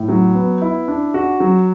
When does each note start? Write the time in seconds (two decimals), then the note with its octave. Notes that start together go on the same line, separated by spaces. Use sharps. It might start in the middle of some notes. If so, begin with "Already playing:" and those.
Already playing: A2
0.09 F#3
0.35 B3
0.61 E4
0.88 D4
1.14 F#4
1.40 F#3